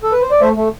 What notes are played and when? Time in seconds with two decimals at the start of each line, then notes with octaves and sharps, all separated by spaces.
0.03 A4
0.12 B4
0.22 C5
0.31 D5
0.41 A3 C5 E5
0.56 A3